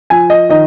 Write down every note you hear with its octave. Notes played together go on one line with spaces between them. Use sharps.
F3 G#5
D#5
D#3 D#5